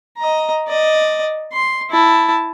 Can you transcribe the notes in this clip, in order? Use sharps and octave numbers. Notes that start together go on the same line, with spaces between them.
D#5 A#5
D5 D#5
C6
E4 A5